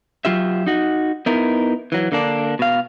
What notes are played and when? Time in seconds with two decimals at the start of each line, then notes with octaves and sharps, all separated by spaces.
0.25 F#3 F4 G4 E5
0.66 D#4 F#4
1.26 B3 D#4 E4 A#4
1.92 E3 F#3
2.12 D3 A#3 D4
2.59 B2 F5